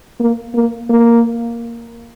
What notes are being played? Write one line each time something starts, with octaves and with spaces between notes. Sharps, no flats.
A#3
A#3
A#3